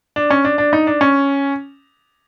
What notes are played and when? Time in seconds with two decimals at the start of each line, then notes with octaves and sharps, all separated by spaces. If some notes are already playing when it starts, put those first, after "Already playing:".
0.16 D4
0.30 C#4
0.45 D4
0.58 D4
0.73 D#4
0.87 D4
1.01 C#4